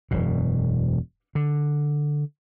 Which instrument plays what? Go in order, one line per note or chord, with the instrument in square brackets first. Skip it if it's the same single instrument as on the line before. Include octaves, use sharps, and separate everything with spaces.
[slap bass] E1 F#2 B2
D3